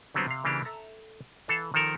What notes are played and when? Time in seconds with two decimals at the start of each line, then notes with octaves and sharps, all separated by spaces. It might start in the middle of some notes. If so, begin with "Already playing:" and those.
0.14 D3 F#3 G3 B3 C4
0.28 C3 F5
0.44 C#3 E3 A#3 D4 G4
0.65 A4 E5 A#5
1.48 E3 A4 F5 A5
1.74 D#3 F3 A4 A#4